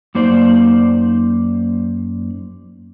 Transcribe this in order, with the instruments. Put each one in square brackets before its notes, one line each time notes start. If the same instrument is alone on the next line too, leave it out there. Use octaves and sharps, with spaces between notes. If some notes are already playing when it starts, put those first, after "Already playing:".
[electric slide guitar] F#2 A#3 D#4 C5 D5